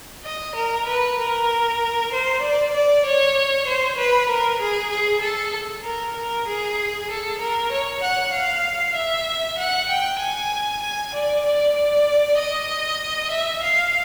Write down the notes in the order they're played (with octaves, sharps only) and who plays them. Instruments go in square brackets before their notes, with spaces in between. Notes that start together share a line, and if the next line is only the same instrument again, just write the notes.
[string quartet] D#5
A#4
B4
A#4
C5
D5
D5
C#5
C5
B4
A#4
G#4
G#4
A4
A#4
A#4
G#4
A4
A#4
C#5
F#5
F5
E5
F#5
G5
G#5
G#5
D5
D5
D5
D#5
E5
F5